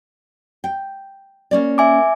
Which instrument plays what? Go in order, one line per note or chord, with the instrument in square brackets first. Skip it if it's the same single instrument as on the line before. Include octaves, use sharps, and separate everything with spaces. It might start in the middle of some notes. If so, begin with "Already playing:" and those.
[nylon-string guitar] G5
A#3 C#4 D5
[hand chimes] E5 G#5 D6